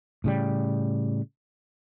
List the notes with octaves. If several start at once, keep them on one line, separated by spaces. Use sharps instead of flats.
A2 C#3 G3